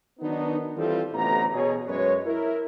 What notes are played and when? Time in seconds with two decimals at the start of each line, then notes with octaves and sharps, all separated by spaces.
0.19 D#3 F#3 B3 D4 D#4
0.75 E3 G3 C4 E4 F4 A4
1.12 A1 D2 C3 B3 A#5
1.52 B2 G#4 C#5
1.86 F#2 G#3 B4 C#5
2.25 E4 A#4